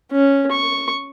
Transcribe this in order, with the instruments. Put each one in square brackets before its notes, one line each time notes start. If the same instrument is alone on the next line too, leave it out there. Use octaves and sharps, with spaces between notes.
[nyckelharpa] C#4
C#6